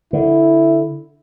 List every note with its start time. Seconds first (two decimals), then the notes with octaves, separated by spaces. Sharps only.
0.13 D3 E4